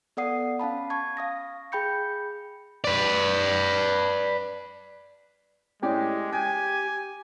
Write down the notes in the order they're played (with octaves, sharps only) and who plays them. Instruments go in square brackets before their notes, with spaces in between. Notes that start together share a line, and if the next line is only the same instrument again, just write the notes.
[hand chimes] B3 A4 D5 F#5 D#6 C7
C#4 F5 A5 B5
A5 C#6 G#6
F5 D#6 A#6
G#4 G5 B5 G6 C#7
[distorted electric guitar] B4 D5
[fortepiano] A2 C#4 D5 [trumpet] G#3 [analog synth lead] G4
[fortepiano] G5 [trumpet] G#5